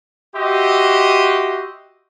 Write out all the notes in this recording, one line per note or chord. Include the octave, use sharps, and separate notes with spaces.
F#4 G4 D#5 E5 C6